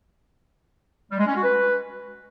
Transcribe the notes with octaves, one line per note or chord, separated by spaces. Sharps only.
G3
G#3
C#4
F#4
B4